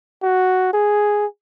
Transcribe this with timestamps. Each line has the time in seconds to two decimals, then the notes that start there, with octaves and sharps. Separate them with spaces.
0.23 F#4
0.73 G#4